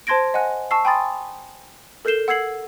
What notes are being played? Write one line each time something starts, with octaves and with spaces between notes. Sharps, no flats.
C5 A5 C6 G#6 A#6 D7
D#5 F#5 G#5 F#6
A5 C#6 E6 C7
G5 G#5 B5 C6 D#6 A6
A4 A#4 G6 C7 E7 G7
F#5 E6 G#6 C7 F#7